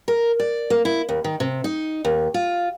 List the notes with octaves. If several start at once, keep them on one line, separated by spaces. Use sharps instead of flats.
A#4
D5
A#3
E4
D#2
D#3
C3
D#4
D#2
F4